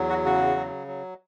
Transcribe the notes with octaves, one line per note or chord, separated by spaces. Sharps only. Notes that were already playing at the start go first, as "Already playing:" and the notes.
Already playing: E2 F#3
F#4
C#3 F#4
F#3
F#3